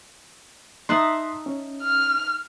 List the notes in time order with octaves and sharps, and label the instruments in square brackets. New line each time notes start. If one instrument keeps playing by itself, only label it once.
[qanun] D#4 E5 A5 [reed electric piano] C6 F#6
[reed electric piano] C#4
[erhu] F6